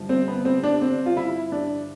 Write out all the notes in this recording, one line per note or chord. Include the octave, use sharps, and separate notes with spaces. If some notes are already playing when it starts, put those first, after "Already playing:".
Already playing: G1 G2 F3
C4
B3
C4
D4
C4
F4
E4
D4